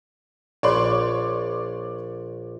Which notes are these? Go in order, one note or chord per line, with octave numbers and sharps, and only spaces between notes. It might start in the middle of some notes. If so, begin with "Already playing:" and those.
A#1 C#5 D5 C6